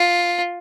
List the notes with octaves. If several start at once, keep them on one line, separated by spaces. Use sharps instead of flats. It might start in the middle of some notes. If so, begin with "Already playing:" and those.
Already playing: F4